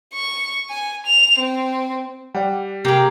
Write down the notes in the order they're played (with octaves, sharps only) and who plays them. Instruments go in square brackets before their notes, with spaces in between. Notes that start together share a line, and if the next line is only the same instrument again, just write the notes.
[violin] C#6
G#5
F7
C4
[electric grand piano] G3 [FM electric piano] D5 F#5 G5
[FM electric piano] C3 [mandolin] A#3 G#4 [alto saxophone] G4